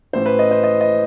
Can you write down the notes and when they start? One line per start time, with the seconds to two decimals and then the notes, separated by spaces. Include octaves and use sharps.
0.13 A1 A2 E3 C5
0.26 B4
0.39 D#5
0.51 C5
0.64 D#5
0.81 D#5